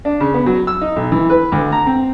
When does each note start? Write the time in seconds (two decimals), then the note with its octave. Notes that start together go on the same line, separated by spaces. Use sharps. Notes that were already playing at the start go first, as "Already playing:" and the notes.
0.05 D4
0.20 C#3
0.34 B3
0.46 F#3
0.67 E6
0.81 D#4
0.96 B1
1.12 E3
1.30 B4
1.52 D2
1.72 A#5
1.87 C4